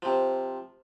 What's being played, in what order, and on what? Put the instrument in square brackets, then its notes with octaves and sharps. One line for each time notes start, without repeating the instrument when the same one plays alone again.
[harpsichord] C3 F3